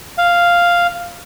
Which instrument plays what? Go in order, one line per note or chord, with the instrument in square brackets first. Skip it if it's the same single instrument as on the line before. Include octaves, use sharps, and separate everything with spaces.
[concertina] F5